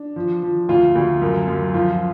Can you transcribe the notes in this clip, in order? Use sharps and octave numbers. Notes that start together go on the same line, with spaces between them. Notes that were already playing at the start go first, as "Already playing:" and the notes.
Already playing: D4
F3
F3
D2 F4
D2
F#2
F#2
F3 F4